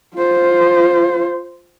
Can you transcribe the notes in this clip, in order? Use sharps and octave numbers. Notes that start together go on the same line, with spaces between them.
F4 C5